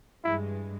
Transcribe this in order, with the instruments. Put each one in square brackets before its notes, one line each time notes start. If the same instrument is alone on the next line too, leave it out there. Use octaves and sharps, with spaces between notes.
[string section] G2 E3 G#3 [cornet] E4